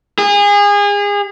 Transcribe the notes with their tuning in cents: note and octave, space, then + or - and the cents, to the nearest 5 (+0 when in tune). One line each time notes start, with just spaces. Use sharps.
G#4 -30